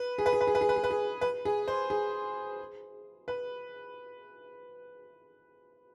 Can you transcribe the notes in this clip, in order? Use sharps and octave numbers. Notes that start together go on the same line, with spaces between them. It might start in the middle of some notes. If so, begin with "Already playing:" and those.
Already playing: B4
G#4
B4
G#4
B4
G#4
B4
G#4
B4
G#4
B4
G#4
B4
G#4
C5
G#4
B4